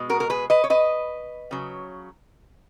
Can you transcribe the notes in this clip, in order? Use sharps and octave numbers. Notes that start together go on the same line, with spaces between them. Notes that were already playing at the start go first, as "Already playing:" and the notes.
Already playing: B2 G#3
F#4 A#4
A#4
G#4 B4
B4 D#5
C#5
B4 D#5
C#3 F#3